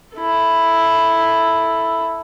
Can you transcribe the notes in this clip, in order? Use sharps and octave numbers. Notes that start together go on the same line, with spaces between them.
E4 A4